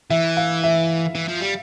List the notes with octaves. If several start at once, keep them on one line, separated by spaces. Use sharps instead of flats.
E3 E5
F5
E5
E3
F3
G3